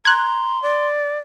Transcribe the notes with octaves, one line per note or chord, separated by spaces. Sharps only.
A#5 C6 F#6 G#6
D5